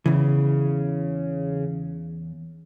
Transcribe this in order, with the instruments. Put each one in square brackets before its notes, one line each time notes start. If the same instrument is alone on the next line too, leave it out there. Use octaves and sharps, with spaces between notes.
[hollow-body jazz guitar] E2 E3 [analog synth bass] C#3